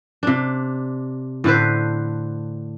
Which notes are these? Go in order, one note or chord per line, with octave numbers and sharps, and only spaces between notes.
C3 D4
A2 D3 B4 C5